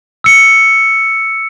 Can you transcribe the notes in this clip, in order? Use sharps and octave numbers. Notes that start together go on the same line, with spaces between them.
E6 C#7